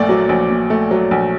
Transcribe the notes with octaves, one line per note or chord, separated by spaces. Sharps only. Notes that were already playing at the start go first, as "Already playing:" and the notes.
Already playing: A#1 A#2 A3 D5
F#3
A#1
A#2
A3
F#3
A#1